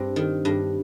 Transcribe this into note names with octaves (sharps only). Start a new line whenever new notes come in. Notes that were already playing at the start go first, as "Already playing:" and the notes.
Already playing: G2 C4
D#3
G2